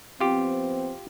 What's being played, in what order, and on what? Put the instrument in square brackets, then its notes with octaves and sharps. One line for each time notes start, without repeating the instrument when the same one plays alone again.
[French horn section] F3 B3 C4 [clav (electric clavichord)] F4 G4